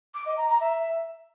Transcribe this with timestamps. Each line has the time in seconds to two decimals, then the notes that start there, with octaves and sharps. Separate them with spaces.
0.14 D6
0.26 D#5
0.37 A#5
0.49 A#5
0.61 E5